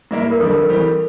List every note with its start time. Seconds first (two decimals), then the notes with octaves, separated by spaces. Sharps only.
0.11 A2 G3 A#3 E4 A#4
0.31 A#4
0.40 F2 D3 G3 A4
0.55 A#4
0.69 E3 G3 C4 G4